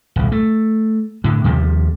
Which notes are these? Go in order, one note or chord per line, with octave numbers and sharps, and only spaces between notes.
D#1 C2
A3
A2 D3
D#2 C3 F3 G3